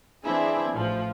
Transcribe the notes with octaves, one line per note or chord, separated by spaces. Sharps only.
E3 C4 D4 E4 G#4
A1 F3